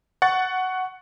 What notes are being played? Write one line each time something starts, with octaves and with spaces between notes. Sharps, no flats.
F#5 C#6 A6